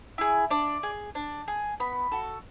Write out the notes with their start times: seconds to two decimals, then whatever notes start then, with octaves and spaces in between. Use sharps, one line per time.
0.18 E4 G#4
0.50 D4 D5
0.83 G#4
1.15 D4
1.48 G#4
1.80 B3 B5
2.12 F#4 A4